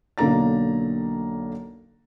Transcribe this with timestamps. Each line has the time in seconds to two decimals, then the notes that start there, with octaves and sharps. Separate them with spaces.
0.18 B1 D3 A#3 A4 A#5 A6